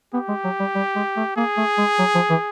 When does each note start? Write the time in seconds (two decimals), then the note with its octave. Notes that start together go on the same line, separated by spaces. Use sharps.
0.14 B3 G4
0.28 G#3
0.44 F#3
0.60 G3
0.75 G3
0.96 G#3
1.17 A3
1.36 A#3 G#4
1.57 A3
1.78 G#3
1.99 F#3
2.15 F3
2.30 E3